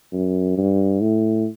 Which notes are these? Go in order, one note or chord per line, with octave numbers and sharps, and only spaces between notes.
F#2
G2
A2